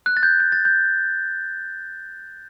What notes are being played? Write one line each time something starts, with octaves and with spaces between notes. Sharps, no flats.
F#6
A6
G6
G6
A6
G6